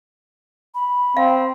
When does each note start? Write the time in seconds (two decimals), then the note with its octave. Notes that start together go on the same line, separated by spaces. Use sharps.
0.75 B5
1.17 C4 F5